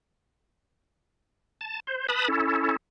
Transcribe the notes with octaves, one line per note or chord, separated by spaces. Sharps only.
A5
C5
B4 A5 B5 D#6
C#4 E4 A4